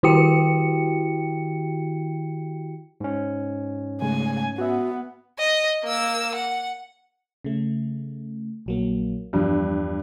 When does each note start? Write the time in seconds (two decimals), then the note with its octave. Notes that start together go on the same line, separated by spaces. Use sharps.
0.03 D#3 E4 F#4 G4 G5 C#7
3.00 G#2 C#4
4.02 C#3 G#3 A3 G#5
4.58 B3 F#4 E5
5.39 D#5
5.84 A#3 E6
6.35 F#5
7.44 C#3 A3
8.66 A#1 F#3 A#3
9.33 E2 G2 F3